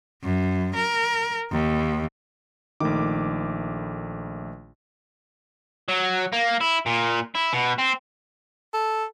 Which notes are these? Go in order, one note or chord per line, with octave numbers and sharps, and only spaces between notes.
F#2
A#4
D#2
A#1 D#3 A3 D6
F#3
A#3
E4
A#2
E4
B2
C4
A4